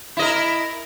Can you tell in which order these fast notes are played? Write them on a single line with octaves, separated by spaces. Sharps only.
E4 D#5 A#4